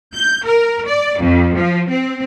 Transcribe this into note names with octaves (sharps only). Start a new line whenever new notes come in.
G6
A#4
D5
F2
F3
C4